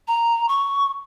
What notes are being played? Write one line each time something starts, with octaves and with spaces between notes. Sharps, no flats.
A#5
C#6